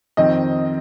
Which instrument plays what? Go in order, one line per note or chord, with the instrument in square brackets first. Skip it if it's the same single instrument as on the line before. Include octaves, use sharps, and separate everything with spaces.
[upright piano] F2 D#3 C4 D#5